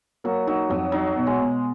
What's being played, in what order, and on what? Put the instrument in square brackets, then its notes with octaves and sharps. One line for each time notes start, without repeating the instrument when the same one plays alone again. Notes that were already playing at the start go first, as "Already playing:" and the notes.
[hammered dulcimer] F#3 [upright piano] A#3
[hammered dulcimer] F#3 [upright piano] D#4
[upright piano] F2 [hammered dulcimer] F#3
[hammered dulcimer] F#3 [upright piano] D#4
[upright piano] B2
[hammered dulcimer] G#3
[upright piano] B2